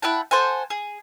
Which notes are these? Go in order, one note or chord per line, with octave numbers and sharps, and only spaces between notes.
E4 F#5 G5 A5
A4 C5 F#5 G#5
G#4